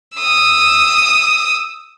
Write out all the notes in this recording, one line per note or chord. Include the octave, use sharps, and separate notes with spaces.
D#6 E6